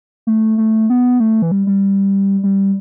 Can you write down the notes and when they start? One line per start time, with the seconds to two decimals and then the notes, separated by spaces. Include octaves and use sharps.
0.27 A3
0.58 A3
0.90 B3
1.20 A3
1.42 E3
1.51 G3
1.67 G3
2.43 G3